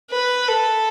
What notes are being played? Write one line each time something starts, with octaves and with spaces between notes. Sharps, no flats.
B4
A4